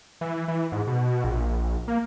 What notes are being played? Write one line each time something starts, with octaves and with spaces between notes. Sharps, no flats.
E3
E3
G#2
B2
A#1
A#3